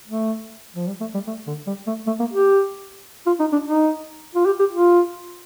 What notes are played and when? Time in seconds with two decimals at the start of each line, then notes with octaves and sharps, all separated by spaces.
0.07 A3
0.75 F3
0.87 G3
1.00 A3
1.14 G3
1.27 A3
1.47 D3
1.67 G3
1.87 A3
2.07 A3
2.19 A#3
2.33 G4
3.26 F4
3.39 D#4
3.52 D4
3.65 D#4
4.35 F4
4.46 G4
4.59 G4
4.72 F4